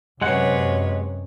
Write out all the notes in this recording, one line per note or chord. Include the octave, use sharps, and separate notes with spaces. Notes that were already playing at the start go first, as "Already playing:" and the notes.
F#2 C3 G#3 B4 C#5 F#5